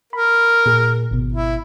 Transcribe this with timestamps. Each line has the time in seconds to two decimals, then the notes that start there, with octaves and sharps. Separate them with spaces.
0.13 A#4 B5
0.66 A#2 G#4
1.11 G#1 B2
1.32 E4